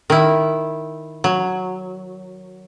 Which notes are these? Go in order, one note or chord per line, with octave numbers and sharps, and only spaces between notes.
D#3 E4
F#3